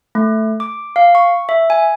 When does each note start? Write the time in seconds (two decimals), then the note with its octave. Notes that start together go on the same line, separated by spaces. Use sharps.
0.15 A3
0.60 D6
0.96 F5
1.15 C#6
1.49 E5
1.70 G#5